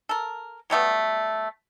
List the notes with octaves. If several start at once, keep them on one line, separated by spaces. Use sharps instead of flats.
A4 A#4
F#3 G3 A3 B3